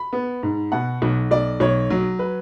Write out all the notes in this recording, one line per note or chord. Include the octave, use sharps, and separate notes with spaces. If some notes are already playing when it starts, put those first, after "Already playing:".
Already playing: B5
B3
G#2
B2 F#5
B1
B1 D5
B1 C#5
F#3
B4